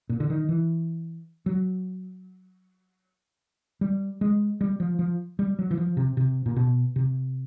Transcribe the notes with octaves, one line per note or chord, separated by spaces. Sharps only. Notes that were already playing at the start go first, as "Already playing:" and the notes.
A#2
D3
D#3
E3
F#3
G3
G#3
G3
F3
F3
G3
F#3
E3
F3
C3
C3
A#2
B2
C3